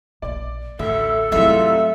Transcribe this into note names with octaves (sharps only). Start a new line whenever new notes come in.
A#1 A#3 D5
A1 D2 A4 E5
C2 G#2 E3 F#3 A3 F4 E5